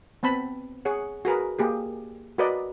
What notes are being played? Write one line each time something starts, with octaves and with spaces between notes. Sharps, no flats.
B3 C4 A5 B5
G#4 C#5 F#5
F#4 G#4 A#4 B4
A#3 G4 G#4
F#4 A#4 B4 D5 D#5